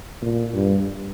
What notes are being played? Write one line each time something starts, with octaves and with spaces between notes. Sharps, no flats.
A#2
G2